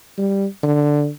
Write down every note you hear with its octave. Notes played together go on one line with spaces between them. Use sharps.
G3
D3